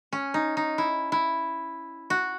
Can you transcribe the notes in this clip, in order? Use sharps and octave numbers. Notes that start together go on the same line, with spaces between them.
C#4
D#4
D#4
E4
E4
F#4